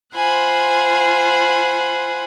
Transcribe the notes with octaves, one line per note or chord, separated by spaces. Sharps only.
F4 C5 F#5 G#5 B5